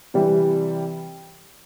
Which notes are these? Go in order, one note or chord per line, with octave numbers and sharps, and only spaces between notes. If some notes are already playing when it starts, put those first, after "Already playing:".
C3 E3 G3